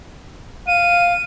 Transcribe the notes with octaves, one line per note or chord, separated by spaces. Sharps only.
F5 D#7